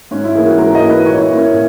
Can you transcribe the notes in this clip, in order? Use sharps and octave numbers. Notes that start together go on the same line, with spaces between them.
G#2 C#4
E4
E3 A#3 G#4
F#4
G#2 A#4
D#5
E3 A#3
B4
A#2 C#5
E4
A#3
C#4
A#2